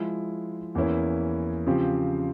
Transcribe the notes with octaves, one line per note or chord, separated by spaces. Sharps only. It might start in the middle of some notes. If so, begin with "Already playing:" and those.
Already playing: F3 G#3 E4
E2 E3 A#3 C#4 E4
C#3 F3 C4 G4